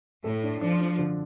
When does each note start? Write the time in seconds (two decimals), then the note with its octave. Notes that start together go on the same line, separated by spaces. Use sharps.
0.24 A2 A4
0.43 D4
0.61 F3 D4
0.80 D4
0.99 D3